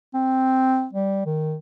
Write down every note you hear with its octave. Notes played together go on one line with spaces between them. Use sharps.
C4
G3
D#3